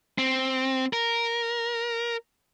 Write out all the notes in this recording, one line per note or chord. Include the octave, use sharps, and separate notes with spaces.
C4
A#4